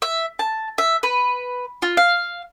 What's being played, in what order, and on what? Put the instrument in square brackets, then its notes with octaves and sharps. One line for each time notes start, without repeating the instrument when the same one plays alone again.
[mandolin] E5
A5
E5
B4
F4
F5